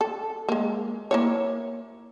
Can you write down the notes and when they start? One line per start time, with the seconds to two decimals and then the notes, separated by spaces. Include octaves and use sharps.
0.01 A4
0.49 G#3 A#3
1.11 A#3 E4 C#5